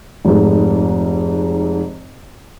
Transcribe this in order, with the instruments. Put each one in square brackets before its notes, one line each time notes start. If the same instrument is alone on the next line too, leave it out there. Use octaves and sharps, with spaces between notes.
[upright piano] F1 G#2